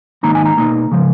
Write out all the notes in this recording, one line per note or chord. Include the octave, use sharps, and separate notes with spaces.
G#2 D#3 A#3 D#4 A#5
G#5
A#5
B2 A#3 D#4
C#3 F3 G#3